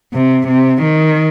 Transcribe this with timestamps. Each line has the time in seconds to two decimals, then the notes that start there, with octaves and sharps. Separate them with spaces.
0.14 C3
0.48 C3
0.82 D#3